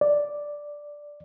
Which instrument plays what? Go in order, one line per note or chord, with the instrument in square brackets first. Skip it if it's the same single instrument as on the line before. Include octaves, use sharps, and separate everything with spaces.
[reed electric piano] D5